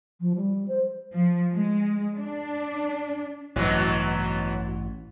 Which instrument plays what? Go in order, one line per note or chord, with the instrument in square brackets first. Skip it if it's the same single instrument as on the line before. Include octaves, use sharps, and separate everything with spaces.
[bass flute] F3
G3
C5
[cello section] F3
G#3
D4
[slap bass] A1 G2 [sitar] B2 E3 F#3